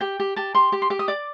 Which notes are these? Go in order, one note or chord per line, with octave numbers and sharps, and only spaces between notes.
G4 G5
G4
G4 A5
G4 C6
G4 D6
C6
G4 D6
D#6
D5 D6